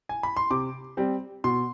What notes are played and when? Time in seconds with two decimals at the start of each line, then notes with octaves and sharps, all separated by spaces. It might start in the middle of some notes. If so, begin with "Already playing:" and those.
0.09 G#5
0.23 B5
0.37 C6
0.51 C3 D6
0.97 G3 C4
1.44 B2 C6